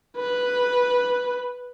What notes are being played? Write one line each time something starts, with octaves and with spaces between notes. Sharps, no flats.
B4